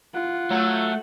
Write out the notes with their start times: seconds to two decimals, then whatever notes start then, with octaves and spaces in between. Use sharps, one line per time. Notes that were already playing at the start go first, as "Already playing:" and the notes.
0.14 F4 F#5
0.51 F#3 A3